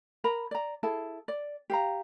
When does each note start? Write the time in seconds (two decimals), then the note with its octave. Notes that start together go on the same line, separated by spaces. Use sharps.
0.24 A#4 A#5 B5
0.51 D5 A#5
0.83 E4 G#4 A4 A5
1.28 D5
1.70 G4 F5 A#5